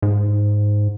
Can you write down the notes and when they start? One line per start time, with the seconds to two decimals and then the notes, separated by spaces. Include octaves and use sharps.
0.02 G#2